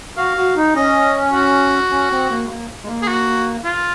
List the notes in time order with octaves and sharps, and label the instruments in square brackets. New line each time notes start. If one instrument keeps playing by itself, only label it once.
[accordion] F#4 [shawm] F5
[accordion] F#4
D#4
[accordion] C#4 [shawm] D#5
[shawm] F#4
[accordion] C#4
C4
A#3
G#3
A#3
G#3
A#3
[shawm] G#4
F#4
F4